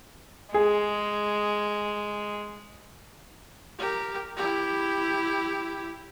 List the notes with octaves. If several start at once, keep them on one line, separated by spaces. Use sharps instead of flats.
G#3 G#4
G4 A#4
E4 G4